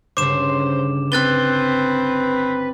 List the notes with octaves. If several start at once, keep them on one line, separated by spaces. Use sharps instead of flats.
G1 C#3 C5 D6 E7
C4 B4 F#6 A6 G7